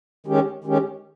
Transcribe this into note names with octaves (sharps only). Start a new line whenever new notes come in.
D#3 G#3 C#4 G4
D#3 G#3 C#4 G4